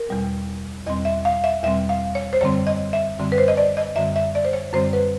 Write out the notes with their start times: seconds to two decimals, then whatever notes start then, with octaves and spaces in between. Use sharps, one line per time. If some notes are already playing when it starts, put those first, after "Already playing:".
Already playing: A#4
0.08 E2 B2 G3 C4
0.86 E2 B2 G3 C4 D#5
1.05 E5
1.25 F5
1.44 E5
1.64 E2 B2 G3 C4 E5
1.89 F5
2.15 C#5
2.33 C5
2.41 F#2 D3 G3 C4 C#5
2.67 D#5
2.93 E5
3.19 F#2 D3 G3 C4
3.32 B4
3.38 C5
3.48 D#5
3.57 D5
3.77 D#5
3.96 F#2 D3 G3 C4 E5
4.16 E5
4.35 D5
4.45 C5
4.53 C#5
4.73 F#2 D3 G3 C4 C5
4.93 B4